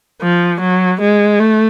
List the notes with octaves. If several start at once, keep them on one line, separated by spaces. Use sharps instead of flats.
F3
F#3
G#3
A3